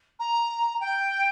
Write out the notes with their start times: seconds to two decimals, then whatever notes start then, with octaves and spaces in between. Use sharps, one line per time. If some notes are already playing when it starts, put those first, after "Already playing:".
0.19 A#5
0.80 G5